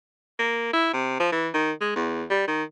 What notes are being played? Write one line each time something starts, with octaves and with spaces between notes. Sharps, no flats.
A#3
E4
C3
F3
E3
D#3
G#3
E2
G3
D#3